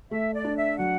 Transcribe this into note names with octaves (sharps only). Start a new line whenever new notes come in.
A3 E5
D5
D4
E5
F#3 F#5